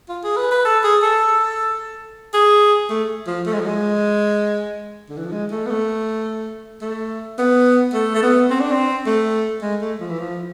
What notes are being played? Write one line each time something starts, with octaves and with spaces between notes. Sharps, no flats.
F4
G#4
B4
B4
A4
G#4
A4
G#4
A3
F3
A3
G#3
F3
G#3
D3
E3
F3
G#3
A3
B3
A3
A3
B3
A3
A3
B3
C4
D4
C4
A3
G#3
A3
F3
E3
F3